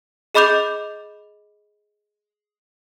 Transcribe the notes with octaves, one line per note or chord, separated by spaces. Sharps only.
G#4 D#5 B5 D6 G6 F7